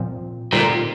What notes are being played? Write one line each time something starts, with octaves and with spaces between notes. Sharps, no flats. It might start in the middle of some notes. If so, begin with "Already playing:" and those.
Already playing: A#2 F3 C4
A#2 D3 G3 C4 D#4